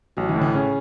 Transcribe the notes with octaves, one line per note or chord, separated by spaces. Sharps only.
A1 F#3
E3
A2
E3
C#3 C#4